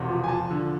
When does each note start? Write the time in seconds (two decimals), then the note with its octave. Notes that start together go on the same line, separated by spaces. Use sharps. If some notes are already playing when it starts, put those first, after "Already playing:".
Already playing: E1 E2 C3 C6
0.08 F3
0.24 G#5
0.28 F3 A5
0.51 D3